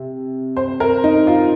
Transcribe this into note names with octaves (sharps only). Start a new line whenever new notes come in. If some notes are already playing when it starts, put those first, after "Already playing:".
Already playing: C3
C5
A#4
D#4
F4